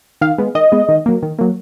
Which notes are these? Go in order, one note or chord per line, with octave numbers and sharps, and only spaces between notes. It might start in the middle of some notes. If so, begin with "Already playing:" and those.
D#3 F5
G#3 B3
D#3 D#5
G#3 B3
D#3
F#3 A#3
D#3
F#3 A#3